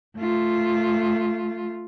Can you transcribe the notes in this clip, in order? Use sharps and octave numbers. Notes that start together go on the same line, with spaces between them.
A3 F4